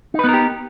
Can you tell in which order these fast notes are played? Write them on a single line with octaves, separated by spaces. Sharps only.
D#4 B4 B3 A#4 G4